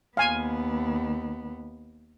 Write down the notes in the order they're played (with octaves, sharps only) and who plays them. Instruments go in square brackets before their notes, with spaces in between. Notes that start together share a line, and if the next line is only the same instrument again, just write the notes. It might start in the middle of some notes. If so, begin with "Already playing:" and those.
[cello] D#2 B3 [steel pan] F5 G#5